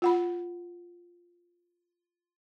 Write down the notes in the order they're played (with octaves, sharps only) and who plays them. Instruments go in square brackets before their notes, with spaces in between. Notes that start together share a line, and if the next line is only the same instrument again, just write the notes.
[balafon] F4 F#5 B5